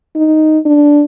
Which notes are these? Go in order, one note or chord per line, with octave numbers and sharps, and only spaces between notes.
D#4
D4